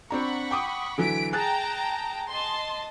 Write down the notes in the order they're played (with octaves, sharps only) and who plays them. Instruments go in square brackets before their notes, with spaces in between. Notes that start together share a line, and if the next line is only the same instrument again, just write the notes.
[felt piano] C4 D4 A#5 [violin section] F#5 B5 C#6
[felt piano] G5 D6 D#6
[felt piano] D3 E3 F#3 [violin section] B6 D7
[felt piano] G#4 F#6 A6 [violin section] G5 A5 A#5
[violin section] D#5 A5 C6